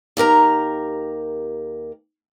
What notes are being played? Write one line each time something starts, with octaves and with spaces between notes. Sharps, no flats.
D#2 G4 A#4 A#5